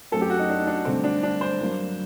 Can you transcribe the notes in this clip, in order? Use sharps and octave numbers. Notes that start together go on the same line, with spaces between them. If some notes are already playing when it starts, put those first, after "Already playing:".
F#2 F#3 A3 C4 A4
G4
F#4
D#4
D4
D4
G2 D3 A3 C4
D4
D4
C5
G2 F#3 A#3